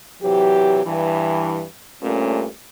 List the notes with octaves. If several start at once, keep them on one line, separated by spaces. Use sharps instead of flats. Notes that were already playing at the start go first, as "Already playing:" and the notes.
C3 E3 F#3 G4
G2 E3
G2 A#2 A3 C#4